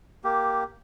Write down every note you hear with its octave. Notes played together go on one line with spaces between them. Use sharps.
A#3 G4